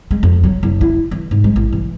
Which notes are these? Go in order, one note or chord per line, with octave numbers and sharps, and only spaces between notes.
G#3
F2
F#3
F#1
E4
E3
G#2
G#3
A1
E3